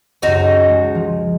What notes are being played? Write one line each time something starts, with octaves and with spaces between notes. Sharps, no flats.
C#2 F#2 D#4 F#4 C5
G#3
F3